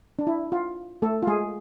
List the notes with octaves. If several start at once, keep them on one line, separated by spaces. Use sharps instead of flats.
D4
E4
F4
A3 A4
F4
G#3 G#4